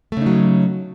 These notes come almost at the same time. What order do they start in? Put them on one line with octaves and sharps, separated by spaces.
A3 C#3 D#4 F#3